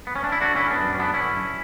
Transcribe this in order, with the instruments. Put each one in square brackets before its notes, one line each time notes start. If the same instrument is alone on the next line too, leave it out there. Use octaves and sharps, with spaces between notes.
[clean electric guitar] B3
C#4
D4
E4
D3 D4 F#4
D3 C#4 E4
F#2 B3 D4
F#2
C#4
D3 B3 D4
D3 C#4 E4
F#2